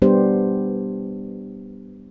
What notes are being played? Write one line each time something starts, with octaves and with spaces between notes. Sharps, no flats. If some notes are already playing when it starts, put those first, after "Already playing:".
G3 B3 D4 G4 C5